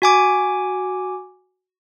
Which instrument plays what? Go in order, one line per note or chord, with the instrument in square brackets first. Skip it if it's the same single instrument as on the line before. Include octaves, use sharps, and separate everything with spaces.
[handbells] F#4 G#5 D6